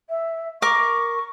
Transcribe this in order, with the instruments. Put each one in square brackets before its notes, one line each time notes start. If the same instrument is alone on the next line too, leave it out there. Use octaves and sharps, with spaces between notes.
[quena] E5
[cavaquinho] A#4 D6 [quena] C#6